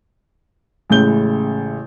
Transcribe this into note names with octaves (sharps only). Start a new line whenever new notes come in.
A1 A2 C#3 G#3 G6 G7